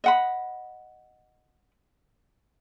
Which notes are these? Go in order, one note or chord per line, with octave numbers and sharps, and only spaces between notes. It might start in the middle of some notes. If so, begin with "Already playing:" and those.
D#5 F#5 B5